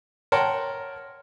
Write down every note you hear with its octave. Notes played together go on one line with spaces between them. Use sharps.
A#4 C#5 F#5 G5 A5 C6